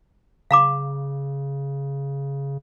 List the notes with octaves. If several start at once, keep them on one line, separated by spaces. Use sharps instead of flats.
C#3 F5 A#5 D6